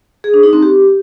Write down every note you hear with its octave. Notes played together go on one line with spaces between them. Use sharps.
G#4
D4
D#4
C4
G4